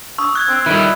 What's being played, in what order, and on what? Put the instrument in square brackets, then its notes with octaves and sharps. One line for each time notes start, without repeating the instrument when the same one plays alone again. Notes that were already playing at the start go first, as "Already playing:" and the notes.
[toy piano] C#6 D#6 [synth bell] E6
[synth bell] F#6 G#6
[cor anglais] C4 [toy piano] E6
[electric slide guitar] D#3 G3 [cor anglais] E4 [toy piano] F4 A4